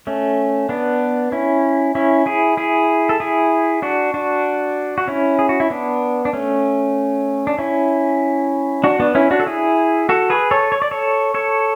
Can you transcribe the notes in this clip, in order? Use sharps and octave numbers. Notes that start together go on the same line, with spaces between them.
A3 C#4
B3 D4
C#4 E4
C#4 E4
E4 G#4
E4 G#4
A4
E4 G#4
D4 F#4
D4 F#4
F#4
C#4 E4
G#4
F#4
E4
B3 D4
D4
A3 C#4
D4
C#4 E4
D4 F#4
B3 D4
C#4 E4
D4 F#4
A4
E4 G#4
F#4 A4
G#4 B4
A4 C#5
C#5
D5
A4 C#5
A4 C#5